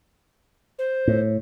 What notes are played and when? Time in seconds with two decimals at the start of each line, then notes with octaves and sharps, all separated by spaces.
0.79 C5
1.07 A2